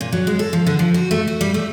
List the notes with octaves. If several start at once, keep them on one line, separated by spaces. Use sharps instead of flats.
A#2
F#3
G#3
A4
F3
D3
F3
F#4
A3
F#4
G3
A3